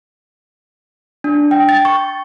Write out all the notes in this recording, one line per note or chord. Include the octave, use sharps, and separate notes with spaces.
D4
G5
A6
C#6